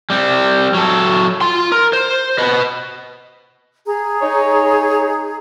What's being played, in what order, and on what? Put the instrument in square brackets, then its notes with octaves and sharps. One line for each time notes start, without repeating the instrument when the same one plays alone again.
[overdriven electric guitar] G3 C4
F#3 A4
F4 C6
A#4
C5
B4 D#5
[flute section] G#4 A#5
[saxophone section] D#4 C#5